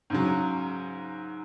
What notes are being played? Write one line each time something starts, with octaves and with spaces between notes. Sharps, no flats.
G#2 C#3 F#3